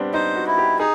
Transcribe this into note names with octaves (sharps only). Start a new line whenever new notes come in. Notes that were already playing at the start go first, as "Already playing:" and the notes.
Already playing: G3 B3 C4 D4
D#4 C5
F#4
E4
G4
D#4 G#4